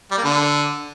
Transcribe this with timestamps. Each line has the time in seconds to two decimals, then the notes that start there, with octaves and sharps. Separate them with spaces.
0.11 G3
0.18 A#3
0.24 D3